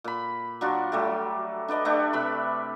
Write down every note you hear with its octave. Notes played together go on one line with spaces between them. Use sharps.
A#2 B5
F#3 D4 F4 F#4
F#3 G3 A3 G4
D4 B4 D5 D#5
A3 D4 G4
C3 B4 B5